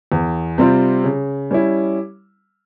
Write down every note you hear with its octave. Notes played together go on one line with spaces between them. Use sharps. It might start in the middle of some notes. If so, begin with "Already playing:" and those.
E2
C3 G3 C4 F4
C#3
G3 C#4 E4